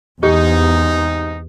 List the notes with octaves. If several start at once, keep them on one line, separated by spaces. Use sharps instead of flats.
E2 G#2 C3 D#4 G4